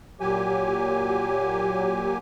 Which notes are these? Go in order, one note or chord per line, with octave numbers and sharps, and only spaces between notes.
A#2 F#3 G4 G#5